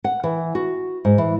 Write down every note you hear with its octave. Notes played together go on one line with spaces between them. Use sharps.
F#5
E3
F#4
G#2
E3